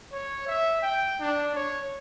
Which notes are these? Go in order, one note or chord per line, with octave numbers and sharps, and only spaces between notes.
C#5
E5
G5
D4
C#5